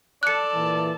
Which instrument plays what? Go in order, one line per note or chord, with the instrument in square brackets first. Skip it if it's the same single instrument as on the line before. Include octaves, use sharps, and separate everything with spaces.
[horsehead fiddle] A4 A5 [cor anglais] D5 [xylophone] F#6 C#7
[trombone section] A#2 E3